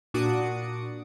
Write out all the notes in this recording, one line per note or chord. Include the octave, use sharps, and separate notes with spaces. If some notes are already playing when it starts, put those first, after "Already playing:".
A#2 D4 F#4 D6 D#6 C#7